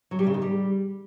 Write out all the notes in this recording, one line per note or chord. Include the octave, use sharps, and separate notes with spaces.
F#3
G3
C#3
D#3
G3